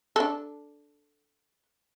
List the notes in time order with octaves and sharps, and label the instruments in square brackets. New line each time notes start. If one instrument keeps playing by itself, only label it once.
[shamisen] D4 A4